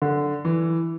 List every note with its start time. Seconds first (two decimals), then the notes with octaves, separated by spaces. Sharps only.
0.02 D3
0.45 E3